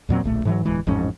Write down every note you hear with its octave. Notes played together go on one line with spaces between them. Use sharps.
E2 A#2 F#3 C4
D1 A#1 A3
G#2 E3 F#3
D1 E2 E3 G#3
A1 F2 G#2 C#4